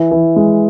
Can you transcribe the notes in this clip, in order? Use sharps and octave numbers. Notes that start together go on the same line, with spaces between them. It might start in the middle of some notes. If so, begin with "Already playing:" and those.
Already playing: E3
E3
G#3